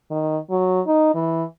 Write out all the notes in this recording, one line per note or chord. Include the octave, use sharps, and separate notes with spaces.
D#3
F#3
D#4
E3